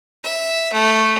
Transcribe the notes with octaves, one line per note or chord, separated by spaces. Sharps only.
E5
A3